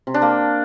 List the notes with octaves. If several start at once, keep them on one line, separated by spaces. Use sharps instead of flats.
C3
D4
A#3